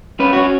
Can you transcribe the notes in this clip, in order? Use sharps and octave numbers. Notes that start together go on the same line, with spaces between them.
C#4 B4
C#4 F#4